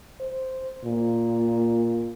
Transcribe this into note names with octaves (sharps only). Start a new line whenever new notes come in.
C5
A#2